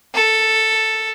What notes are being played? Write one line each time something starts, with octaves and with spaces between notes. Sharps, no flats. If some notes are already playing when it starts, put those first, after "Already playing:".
A4